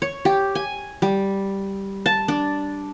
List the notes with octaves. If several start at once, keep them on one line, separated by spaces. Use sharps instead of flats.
C#5
G4
G#5
G3
A5
D4